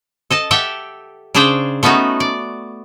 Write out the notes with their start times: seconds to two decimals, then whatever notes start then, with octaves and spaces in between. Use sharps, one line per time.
0.30 A4 D#5 A5
0.51 G4 A4 E5 F#5 G5
1.34 C#3 D4 G#4 C5 D5 G5
1.83 A3 B3 C#4 D#4 F#4 B4
2.20 D5